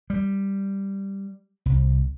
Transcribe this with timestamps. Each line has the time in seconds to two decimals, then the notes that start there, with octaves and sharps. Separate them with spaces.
0.10 G3
1.66 C2